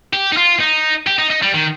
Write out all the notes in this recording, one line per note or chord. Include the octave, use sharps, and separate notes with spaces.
G4
D#4
F4
D#4
G4
D#4
D#4
G3
D#3